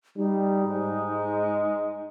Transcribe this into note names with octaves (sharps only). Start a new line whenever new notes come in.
G3 D#4
G#2 G#3